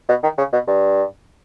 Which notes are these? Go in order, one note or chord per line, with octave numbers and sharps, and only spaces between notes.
B2
D#3
C#3
B2
G2